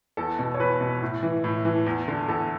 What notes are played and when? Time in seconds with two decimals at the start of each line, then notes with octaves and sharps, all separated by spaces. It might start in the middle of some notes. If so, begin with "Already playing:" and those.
0.17 E2 A4
0.39 B2
0.54 C#5
0.59 E2 B4
0.81 B2
1.02 A2
1.23 E3
1.44 A2
1.65 E3
1.86 E2
2.08 D3
2.28 E2 A4